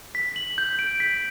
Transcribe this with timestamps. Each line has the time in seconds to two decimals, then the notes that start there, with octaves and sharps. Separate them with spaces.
0.15 B6
0.36 F#7
0.58 G6
0.79 D7
1.00 B6